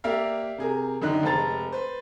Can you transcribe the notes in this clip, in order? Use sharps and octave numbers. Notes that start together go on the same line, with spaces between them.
A#3 G4 A#4 D5 E5 F5
C3 G#4 A#4
F#2 D3 D#3 D#4 F#6
F1 G#3 C5 A5 A#5 A6
B4 C5